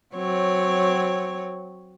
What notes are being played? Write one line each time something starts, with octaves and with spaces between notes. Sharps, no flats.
F#3 C4 C#5